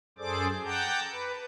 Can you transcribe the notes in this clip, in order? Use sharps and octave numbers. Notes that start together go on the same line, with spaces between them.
F#2 G#4 A4 C5 D5 D6
F#5 G5 A5 A#5 D6 G6
B4